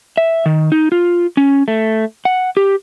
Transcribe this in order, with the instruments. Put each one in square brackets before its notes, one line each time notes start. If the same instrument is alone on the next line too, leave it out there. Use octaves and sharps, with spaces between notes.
[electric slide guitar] E5
D#3
D#4
F4
C#4
A3
F#5
G4